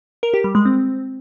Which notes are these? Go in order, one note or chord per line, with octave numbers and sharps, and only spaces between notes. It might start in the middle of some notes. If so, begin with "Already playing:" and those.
A#4
G4
G3
G#3
C4